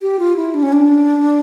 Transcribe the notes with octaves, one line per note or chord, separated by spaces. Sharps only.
G4
F4
E4
D4
C#4
D4